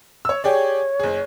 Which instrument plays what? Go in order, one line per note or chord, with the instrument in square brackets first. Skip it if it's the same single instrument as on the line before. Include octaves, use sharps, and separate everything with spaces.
[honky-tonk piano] C#5 E6
[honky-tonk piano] G4 G#4 D5 [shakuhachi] C#5
[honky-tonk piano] F#1 G#4